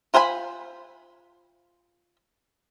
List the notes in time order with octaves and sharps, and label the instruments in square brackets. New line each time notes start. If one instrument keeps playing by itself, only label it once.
[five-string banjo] F4 C5 F5 G#5 B5